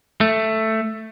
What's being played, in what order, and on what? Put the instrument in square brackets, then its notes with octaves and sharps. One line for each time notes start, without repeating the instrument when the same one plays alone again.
[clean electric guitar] A3